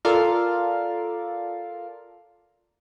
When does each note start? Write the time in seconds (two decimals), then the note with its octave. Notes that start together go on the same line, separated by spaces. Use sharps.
0.05 F4 A4 A#4 D5 F5